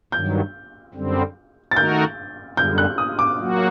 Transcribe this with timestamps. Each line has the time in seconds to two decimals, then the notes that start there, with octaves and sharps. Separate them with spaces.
0.12 G2 D#3 F#3 G6
0.94 F#2 D3 G3 C4
1.71 A6
1.76 D#3 A3 D#4 F#4 A#4 G6
2.57 F#2 D3 G3 G6
2.78 F#6
2.98 D#6
3.19 D6
3.40 F#3 A#3 F#4